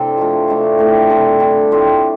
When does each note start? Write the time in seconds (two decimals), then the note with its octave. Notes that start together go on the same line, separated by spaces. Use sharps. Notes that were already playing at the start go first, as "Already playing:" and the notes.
Already playing: A2 C3 C4 D4 A4
0.17 F3 A3 F4
0.48 C3 A3 D4 G4
0.79 A2 A3 C4 A4
1.10 C3 G3 F4 A4
1.40 D3 G3 C4 G4
1.71 A2 F3 A3 C4